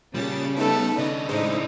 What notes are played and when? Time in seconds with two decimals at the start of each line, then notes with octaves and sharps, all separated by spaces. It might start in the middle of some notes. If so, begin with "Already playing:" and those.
0.14 A#2 C#3 G3 A5 A6
0.56 A3 B3 D#4 A4 B4
0.99 C#3 D4 D#5
1.29 A2 G#3 D#4 E4 C5